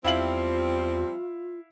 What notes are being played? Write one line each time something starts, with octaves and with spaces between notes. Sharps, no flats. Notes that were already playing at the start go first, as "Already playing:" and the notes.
E2 F3 G3 C4 E4 F4 F5 F#7